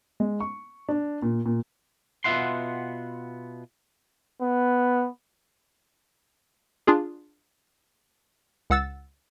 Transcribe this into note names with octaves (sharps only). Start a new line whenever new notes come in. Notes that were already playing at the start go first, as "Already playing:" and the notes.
G#3
C#6
D4
A#2
A#2
B2 B3 F4 E5 F#5 C6
B3
D4 F4 G#4
C#2 F#5 E6 A6